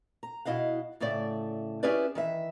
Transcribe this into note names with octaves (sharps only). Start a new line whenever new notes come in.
A#5
B2 E4 D#5 F5 F#5
A2 C#3 A3 D5 E5
C#4 E4 G4 G#4 B4 D5
D#3 E3 E5